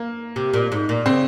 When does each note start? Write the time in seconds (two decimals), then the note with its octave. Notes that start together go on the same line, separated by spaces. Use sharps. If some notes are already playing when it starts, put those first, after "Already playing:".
Already playing: A#3
0.36 C3
0.54 A#2
0.72 G#2
0.89 A#2
1.06 C#3 C4